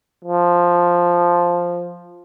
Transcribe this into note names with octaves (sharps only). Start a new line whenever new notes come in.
F3